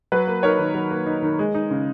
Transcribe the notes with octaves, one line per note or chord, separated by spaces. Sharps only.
F#3 B4
A#3
D#4 A#4 C#5
D#3
F#3
A#3
D#4
D#3
G#3
D#4
C#3